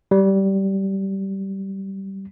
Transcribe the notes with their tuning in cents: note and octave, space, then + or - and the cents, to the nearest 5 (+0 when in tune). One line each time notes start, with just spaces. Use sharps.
G3 -15